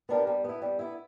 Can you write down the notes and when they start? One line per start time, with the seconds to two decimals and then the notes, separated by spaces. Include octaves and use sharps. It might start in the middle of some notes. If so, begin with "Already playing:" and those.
0.09 B3 D4 G4 A#4
0.27 G3
0.44 B3 E4
0.62 G3
0.79 B3 E4